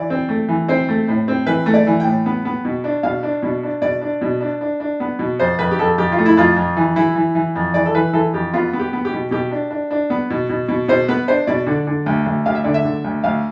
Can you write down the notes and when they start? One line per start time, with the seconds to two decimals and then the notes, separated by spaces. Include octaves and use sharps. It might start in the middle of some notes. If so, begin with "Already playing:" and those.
Already playing: E3 D5
0.10 C4
0.29 A3
0.48 E3
0.68 C4 C5
0.89 A3
1.08 A2
1.28 C4
1.47 E3 B4
1.66 A3
1.74 D5
1.87 E3
2.00 G5
2.05 A2
2.26 B3
2.45 B3
2.65 B2
2.84 D4
3.03 B2 F5
3.23 D4
3.43 B2
3.63 D4
3.82 B2 D5
4.01 D4
4.21 B2
4.41 D4
4.61 D4
4.80 D4
5.00 B3
5.19 B2
5.39 F2 C5
5.59 F2 B4
5.71 G4
5.79 F2 A4
5.98 F2 G4
6.12 F4
6.18 A3
6.26 E4
6.37 F2 F4
6.56 F2
6.76 E3
6.96 E3 E4
7.16 E3
7.35 E3
7.56 F2
7.74 E3 D5
7.86 A4
7.95 E3 B4
8.13 E3 A4
8.34 F2 G4
8.53 B3 F4
8.73 B3
8.79 G4
8.93 B3
9.05 G4
9.12 B2
9.31 B2 G4
9.51 D4
9.71 D4
9.91 D4
10.10 B3
10.30 B2
10.49 B2
10.68 B2
10.88 B2 C5
11.08 B3 B4
11.28 D4 C5
11.47 B2 D5
11.66 D3
11.87 D3
12.06 D2
12.26 D2
12.46 D2 F5
12.55 E5
12.64 D3 D5
12.74 E5
12.84 D3
13.04 D2
13.24 D2 F5